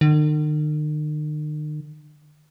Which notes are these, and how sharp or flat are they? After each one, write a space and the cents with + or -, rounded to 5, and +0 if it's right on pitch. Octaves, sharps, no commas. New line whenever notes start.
D#3 -45